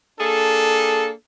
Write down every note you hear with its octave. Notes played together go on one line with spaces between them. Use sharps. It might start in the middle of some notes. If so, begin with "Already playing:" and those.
A#3 D4 G#4 A4